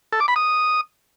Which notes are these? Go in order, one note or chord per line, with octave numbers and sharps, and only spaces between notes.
A4
D6
B5
D#6